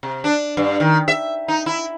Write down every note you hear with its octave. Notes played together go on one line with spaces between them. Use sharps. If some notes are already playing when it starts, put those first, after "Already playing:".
C3
D4
G2
D#3
E5
D#4
E4